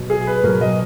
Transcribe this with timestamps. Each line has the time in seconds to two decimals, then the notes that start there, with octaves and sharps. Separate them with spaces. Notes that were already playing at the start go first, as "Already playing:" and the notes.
Already playing: B2 F#3
0.10 G#4
0.27 B4
0.44 B2 F#3 A#4
0.61 D#5